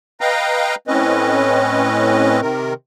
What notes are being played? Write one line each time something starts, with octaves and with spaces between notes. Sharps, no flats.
B4 D#5 F5 G5 A#5
A2 C4 C#4 B4 D#5
C3 D#3 A#4